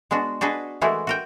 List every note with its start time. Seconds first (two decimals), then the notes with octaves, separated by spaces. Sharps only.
0.11 G#3 B3 D4 F#4
0.41 D4 F#4 G#4 B4 D#5
0.81 E3 G#3 A3 E4 F#4 A#4
1.07 F#4 A#4 G5